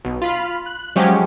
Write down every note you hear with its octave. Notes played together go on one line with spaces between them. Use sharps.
B1
F4 B5 F6
F#6
F3 F#3 G#3 C#4 G4